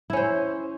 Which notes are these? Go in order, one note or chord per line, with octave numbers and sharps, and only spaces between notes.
C#4 E4 C5